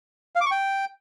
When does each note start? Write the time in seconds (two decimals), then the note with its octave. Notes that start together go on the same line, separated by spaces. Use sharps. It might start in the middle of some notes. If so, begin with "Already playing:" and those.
0.35 F5
0.41 D6
0.46 C#6
0.51 G5